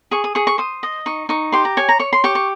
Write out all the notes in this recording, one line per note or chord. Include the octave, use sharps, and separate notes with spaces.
G#4 C#6
D#6
G#4 C#6
C#6
C5 D#6
D#5
D#4 C#6
D#4 C#6
G4 C6
A#5
C#5 G#5
A#5
C#5 C#6
C6
G4 C#6
C#6